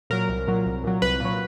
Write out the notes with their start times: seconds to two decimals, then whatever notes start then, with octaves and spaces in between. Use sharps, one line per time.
0.10 A#2 F#3 A#4
0.29 C2
0.48 A#2 F#3
0.66 C2
0.84 A#2 F#3
1.02 C2 B4
1.20 A#2 F#3